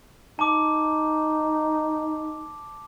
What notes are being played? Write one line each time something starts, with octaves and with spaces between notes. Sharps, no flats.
D#4 A5 D6